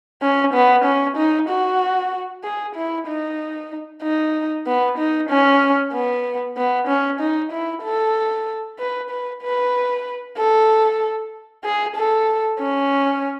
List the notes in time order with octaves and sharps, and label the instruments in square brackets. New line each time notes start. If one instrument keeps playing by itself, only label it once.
[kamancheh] C#4
B3
C#4
D#4
F#4
G#4
E4
D#4
D#4
B3
D#4
C#4
B3
B3
C#4
D#4
E4
A4
B4
B4
B4
A4
G#4
A4
C#4